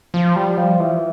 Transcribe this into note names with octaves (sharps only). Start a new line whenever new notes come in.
F3
G3
F3
E3